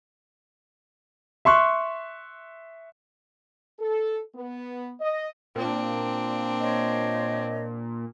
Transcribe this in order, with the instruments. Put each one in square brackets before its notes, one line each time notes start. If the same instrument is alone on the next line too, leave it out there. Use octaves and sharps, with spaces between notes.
[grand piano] E5 C6 C#6 F#6
[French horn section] A4
B3
D#5
[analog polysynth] A#2 [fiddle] C4 D4
[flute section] C5 C#5 D#5